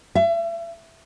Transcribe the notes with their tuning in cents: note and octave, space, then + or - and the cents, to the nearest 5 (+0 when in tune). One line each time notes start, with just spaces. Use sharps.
E5 +35